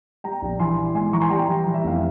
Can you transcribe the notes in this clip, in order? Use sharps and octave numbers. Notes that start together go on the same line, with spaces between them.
G3 G5 A#5
A#1
E3 G#5 C6
E3
G#2 G#5 C6
E3 A#5 C#6
G#5 C6
G3 G5 A#5
E3
E3
E5
F1 F5